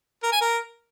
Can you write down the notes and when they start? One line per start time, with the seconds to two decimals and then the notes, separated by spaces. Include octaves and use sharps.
0.23 A#4
0.32 G#5
0.41 A#4